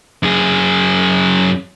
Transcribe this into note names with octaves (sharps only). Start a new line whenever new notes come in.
F#2 G#4